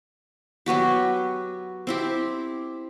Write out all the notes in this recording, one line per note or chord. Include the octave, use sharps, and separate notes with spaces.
F#3 B3 F#4 G4
C4 E4 G4